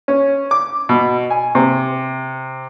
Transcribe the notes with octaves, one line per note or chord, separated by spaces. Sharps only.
C#4
D6
B2
G#5
C3